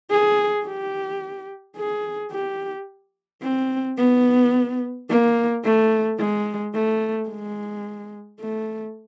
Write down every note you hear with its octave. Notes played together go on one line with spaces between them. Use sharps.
G#4
G4
G#4
G4
C4
B3
A#3
A3
G#3
A3
G#3
A3